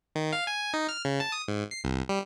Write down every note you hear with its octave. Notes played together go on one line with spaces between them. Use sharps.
D#3
F5
G#5
D#4
F6
C#3
A5
D#6
G#2
C7
C2
G3